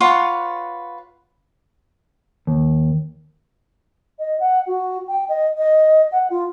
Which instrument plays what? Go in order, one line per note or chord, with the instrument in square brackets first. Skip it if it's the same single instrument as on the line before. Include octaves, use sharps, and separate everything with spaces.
[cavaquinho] F4 B4 C#5 F#5
[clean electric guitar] D#2
[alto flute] D#5
F#5
F#4
G5
D#5
D#5
F#5
F4